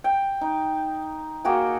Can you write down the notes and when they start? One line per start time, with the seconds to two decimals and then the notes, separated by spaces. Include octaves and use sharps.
0.04 G5
0.41 D#4
1.45 A#3 F#4 G#4 G5